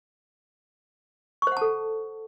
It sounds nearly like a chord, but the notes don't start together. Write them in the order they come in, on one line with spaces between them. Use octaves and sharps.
C#6 C5 F#5 A5 A4